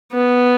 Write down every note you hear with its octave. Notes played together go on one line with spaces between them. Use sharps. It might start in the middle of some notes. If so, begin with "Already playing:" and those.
B3